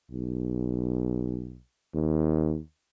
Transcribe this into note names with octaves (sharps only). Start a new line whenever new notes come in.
B1
D#2